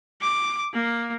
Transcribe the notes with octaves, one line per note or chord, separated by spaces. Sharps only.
D6
A#3